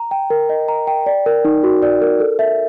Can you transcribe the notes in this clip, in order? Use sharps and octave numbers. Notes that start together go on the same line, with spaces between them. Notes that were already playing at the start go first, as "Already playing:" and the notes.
Already playing: A#5
G5
A#4
D#5
A#5
G5
D5
A#4
D#4
F#4
D5
A#4
A4
E5